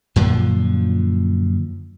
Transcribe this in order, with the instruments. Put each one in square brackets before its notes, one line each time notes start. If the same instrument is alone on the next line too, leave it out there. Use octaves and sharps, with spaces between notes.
[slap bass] F#2 A#2 D3 F3